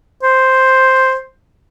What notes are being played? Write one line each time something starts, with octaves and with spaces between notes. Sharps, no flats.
C5